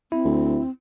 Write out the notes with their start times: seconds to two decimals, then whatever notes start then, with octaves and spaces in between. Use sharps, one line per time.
0.12 C4 E4
0.25 D2